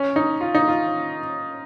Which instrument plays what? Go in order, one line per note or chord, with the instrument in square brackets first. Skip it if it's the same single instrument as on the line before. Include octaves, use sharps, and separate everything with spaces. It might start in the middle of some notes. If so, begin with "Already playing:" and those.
Already playing: [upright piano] C#4
D#4
F4
D#4
F4